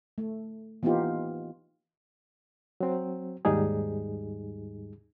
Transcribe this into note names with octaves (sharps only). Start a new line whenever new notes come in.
A3
E3 A#3 B3 D#4 F4 G4
F#3 C4
D#2 G#2 G3 D#4 G#4